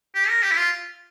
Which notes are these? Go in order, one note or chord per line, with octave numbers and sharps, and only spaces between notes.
G4
A#4
G4
E4
F4